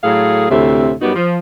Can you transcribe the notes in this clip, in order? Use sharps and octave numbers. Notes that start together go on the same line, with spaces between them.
A2 F#3 G#4 A4 F5
D2 A2 C3 C4 E5
F#2 G3 B3 D#4 F#4
F3